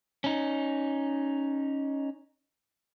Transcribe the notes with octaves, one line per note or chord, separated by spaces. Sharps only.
C#4 D#4